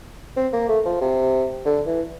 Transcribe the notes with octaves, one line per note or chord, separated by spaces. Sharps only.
C4
A#3
A3
F3
C3
D3
E3